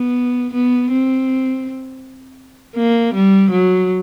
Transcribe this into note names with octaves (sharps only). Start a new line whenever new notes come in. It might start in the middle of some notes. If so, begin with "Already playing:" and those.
Already playing: B3
B3
C4
A#3
G3
F#3